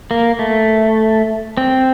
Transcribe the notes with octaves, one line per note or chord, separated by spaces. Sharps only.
A#3
A3
C4